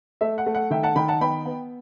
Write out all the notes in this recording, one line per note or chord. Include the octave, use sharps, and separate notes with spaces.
A3 E5
F#5
A3
F#5
D#3 E5 G5
F#5 A5
D#3 G5 B5
F#5 A5
B3 G5 B5
B3